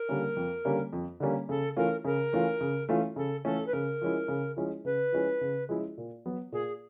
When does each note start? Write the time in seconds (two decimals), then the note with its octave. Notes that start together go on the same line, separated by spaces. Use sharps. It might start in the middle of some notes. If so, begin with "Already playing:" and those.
Already playing: A#4
0.09 D3 G3 A#3 C#4
0.36 F2
0.65 D3 G3 A#3 C#4
0.93 F2
1.20 D3 G3 A#3 C#4
1.49 C#3 A4
1.77 E3 A3 C#4 F4 A#4
2.05 C#3 A#4
2.33 E3 A3 C#4 F4
2.61 C#3
2.89 E3 A3 C#4 F4
3.16 C#3 A4
3.44 E3 A3 C#4 F4 A4
3.66 B4
3.73 C#3 A#4
4.01 F3 G#3 C#4 E4
4.28 C#3
4.56 F3 G#3 C#4 E4
4.85 C#3 B4
5.12 F3 G#3 C#4 E4
5.41 C#3
5.69 F3 G#3 C#4 E4
5.97 A#2
6.25 F#3 B3
6.52 A#2 G#4